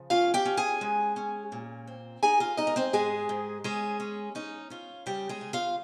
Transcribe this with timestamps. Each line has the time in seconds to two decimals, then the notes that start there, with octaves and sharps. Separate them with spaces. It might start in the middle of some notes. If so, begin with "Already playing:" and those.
Already playing: C#3 F3
0.10 C#4 F4 F5
0.34 G4 G5
0.46 C#4
0.57 G#4 G#5
0.81 G#3
1.16 C#4
1.52 A#2
1.87 C4
2.23 D#4 G#4 G#5
2.40 F4 F5
2.57 G#3 D#4 D#5
2.67 A#4
2.76 C4 C5
2.93 G#2 G#3 G#4
3.29 G#2
3.64 G#3 C#4 G#4
4.00 C#4
4.35 C#4 D#4
4.70 C#4 F4
5.06 C#3 G3 G4
5.29 G#3 G#4
5.41 C#3
5.53 F4 F5